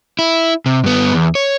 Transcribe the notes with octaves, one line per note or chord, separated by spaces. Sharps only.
E4
C3
G2 B3
E2
C#5